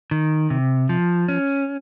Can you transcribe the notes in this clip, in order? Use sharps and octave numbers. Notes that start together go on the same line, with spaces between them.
D#3
C3
F3
C#4